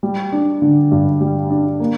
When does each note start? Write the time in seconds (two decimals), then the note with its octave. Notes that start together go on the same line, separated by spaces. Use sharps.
0.03 G3
0.32 D4
0.62 D3
0.92 G2
1.21 G3
1.50 D4
1.80 A#3